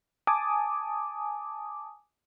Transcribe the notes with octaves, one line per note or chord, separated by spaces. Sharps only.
G#5 A5 D6 D#6